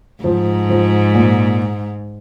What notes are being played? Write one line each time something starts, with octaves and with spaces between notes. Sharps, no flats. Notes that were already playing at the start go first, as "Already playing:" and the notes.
G#2 F3
F3
A#2